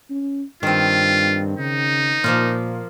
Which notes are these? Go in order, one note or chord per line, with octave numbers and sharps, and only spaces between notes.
C#4
G2 D#3 C4 F4
C#3 D#4
A#2 F3 A#3 F4